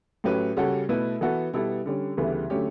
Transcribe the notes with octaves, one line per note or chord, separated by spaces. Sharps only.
A2 F#3 C#4 G4 B4
C#3 G3 C#4 F#4 A4
B2 A3 E4 B4
E3 B3 F#4 A4
B2 G3 B3 E4 A4
D3 G3 C#4
D2 C#3 E3 G3 B3
D3 F#3 A3 C#4 G4